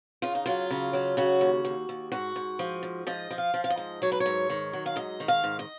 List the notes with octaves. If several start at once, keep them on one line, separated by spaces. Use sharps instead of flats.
C#3 F4
D#4
F#3 F4
C#3
F#3
C#3 F#4
D#2
D#2
D#2
G#2 F#4
G#2
F3
G#2
F3 D#5
F3
F5
F3
F5
D#5
G#2
F#3 C#5
B4
C#5
G#2
D#3
F#3
F5
G#2 D#5
D#3
F5
G#2
D#5